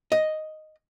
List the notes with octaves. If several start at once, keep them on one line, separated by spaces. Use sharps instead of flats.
D#5